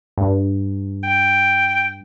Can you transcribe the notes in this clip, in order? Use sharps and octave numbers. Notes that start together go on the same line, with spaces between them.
G2
G5